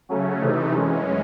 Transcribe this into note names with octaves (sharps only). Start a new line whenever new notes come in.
C#3 F#3 A3 C#4
C3 E3 A3 D#4
F#2 E3 G#3 C#4